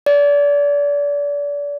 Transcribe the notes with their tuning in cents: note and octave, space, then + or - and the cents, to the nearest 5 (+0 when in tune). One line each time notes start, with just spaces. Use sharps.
D5 -30